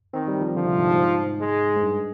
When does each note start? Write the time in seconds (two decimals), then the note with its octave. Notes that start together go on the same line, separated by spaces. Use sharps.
0.14 D#3 C4
0.28 G3
0.41 F3
0.55 D3 F3
0.66 C3
0.77 G#2
0.87 G#2
1.41 G#3
1.76 G#2
1.83 G2